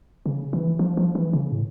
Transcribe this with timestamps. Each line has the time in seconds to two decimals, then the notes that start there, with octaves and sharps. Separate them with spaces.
0.26 C#3
0.53 E3
0.79 F3
0.97 F3
1.15 E3
1.33 C#3
1.52 A2